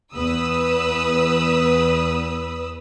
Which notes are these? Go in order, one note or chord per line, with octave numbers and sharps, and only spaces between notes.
E2 B4 D#6 E6